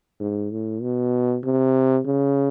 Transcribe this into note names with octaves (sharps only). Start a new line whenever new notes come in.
G#2
A2
B2
C3
C#3